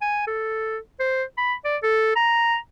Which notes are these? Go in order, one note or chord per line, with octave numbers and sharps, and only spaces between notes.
G#5
A4
C5
B5
D5
A4
A#5